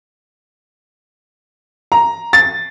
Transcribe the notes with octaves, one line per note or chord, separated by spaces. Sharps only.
A#5
A6